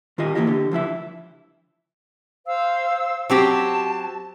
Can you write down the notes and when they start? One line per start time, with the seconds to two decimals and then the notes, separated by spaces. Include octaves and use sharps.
0.18 D#3 F4 G4 D#5
0.35 E3 F3 A#3 E4 G4 D#5
0.47 D3 G4
0.71 C#2 F3 E4 E5
2.46 C5 F5 E6
3.30 F#3 C4 G4 A5